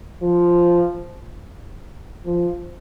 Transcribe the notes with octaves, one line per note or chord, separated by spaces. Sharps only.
F3
F3